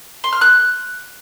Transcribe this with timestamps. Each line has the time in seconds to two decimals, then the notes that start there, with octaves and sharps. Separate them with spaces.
0.24 C6
0.33 F6
0.41 F#6